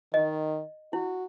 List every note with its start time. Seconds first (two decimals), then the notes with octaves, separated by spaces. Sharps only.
0.14 D#3 D#5
0.93 E4 F#4